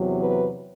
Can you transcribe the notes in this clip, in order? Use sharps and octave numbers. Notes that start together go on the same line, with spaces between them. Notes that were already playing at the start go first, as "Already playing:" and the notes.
Already playing: E2 C3 F#3
B4